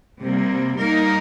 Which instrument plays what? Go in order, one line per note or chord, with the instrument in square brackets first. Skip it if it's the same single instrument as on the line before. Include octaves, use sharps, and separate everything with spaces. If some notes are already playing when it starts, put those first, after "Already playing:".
[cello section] C3 G3 A#3
G3 A#3 D#4 A#4